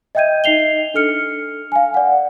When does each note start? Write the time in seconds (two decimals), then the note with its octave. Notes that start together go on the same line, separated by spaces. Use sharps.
0.15 D#5 E5 G5 G6 G#6 D#7
0.44 D#4 D#5 C7 F7 G7
0.94 D4 A4 F6 C#7
1.72 F5 G#5
1.94 D5 F#5